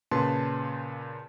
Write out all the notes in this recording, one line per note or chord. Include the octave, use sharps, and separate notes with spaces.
A#2 C#3 B4 A5 C6